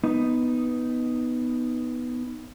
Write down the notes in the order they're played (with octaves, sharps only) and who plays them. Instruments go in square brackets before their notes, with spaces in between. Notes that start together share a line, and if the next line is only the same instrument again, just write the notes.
[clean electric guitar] B3 D#4